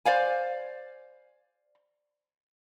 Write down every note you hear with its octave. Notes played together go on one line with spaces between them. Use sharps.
C5 D5 F5 G#5